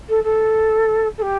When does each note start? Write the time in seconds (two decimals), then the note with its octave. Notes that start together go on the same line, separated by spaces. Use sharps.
0.09 A4
0.24 A4
1.18 A4
1.22 G4